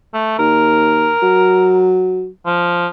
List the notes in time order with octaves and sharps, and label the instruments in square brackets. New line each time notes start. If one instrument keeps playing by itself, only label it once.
[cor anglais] A3
[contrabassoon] D#2 [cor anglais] A#4
[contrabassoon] F#3
[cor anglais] F3